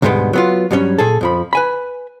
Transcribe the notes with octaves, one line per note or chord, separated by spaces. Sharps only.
D2 G#2 B2 G3 G#3 B3
F#3 B3 F4
G2 F#3 G3 C4 C#4
A#2 G#4 A4
F2 F3 B5
B4 G#5 B5